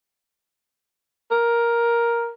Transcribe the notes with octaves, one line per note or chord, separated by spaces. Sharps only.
A#4